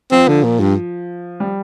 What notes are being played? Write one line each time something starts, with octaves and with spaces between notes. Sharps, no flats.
F3 C4
D3
A#2
G2
G3